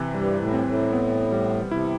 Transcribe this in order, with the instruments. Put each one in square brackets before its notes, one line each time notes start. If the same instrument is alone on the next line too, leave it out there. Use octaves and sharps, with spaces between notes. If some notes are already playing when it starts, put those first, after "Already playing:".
Already playing: [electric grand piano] C3 E3
[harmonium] G2 [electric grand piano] G3
[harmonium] A2
[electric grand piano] C4
[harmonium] A2
[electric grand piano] B3
G3
[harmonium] C3 [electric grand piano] E4